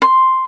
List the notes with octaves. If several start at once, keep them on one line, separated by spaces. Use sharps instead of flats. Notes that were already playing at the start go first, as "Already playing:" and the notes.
C6